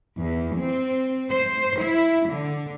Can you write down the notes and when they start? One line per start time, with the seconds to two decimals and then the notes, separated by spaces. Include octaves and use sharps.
0.18 E2
0.57 C4
1.31 C5
1.82 E4
2.28 D3